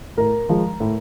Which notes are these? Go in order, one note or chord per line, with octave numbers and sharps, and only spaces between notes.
A2 A#4
F3 G#3
A2